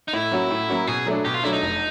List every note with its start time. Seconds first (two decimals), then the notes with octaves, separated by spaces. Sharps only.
0.08 D#4
0.13 A2 E4
0.32 F#3 A#3 C#4 F#4
0.50 A2
0.69 F#3 A#3 C#4 F#4
0.87 B2 G#4
1.06 F#3 A3 D4
1.25 B2 G4
1.34 F4
1.43 F#3 A3 D4 E4
1.53 D#4
1.62 F1